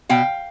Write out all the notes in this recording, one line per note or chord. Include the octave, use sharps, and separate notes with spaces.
B2 F5 G5